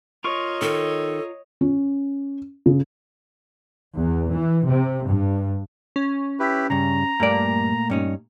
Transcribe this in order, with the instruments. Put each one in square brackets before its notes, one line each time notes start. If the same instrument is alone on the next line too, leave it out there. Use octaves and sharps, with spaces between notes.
[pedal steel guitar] F4 A#4 C#6 [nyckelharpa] C#5 D#5
[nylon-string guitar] D#3 [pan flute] A4
[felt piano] C#4
C#3
[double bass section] E2
E3
C3
G2
[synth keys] C#4
[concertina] E4 G4 B4
[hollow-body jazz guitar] G2 C#3 [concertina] A#5
[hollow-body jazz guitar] G2 D5 [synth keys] A#2 A3 A#3
[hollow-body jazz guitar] G2 C#4 D#4